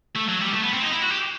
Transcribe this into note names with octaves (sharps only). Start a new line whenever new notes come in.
A3
F#3
G3
A3
B3
C4
D#4
E4
F#4
G4